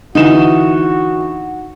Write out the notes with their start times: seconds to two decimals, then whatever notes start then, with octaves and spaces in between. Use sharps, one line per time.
0.15 D3 E3 D#4 F#4 E7